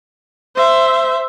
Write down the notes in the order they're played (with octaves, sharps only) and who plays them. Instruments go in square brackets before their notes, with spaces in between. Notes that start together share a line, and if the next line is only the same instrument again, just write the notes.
[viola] C5 E5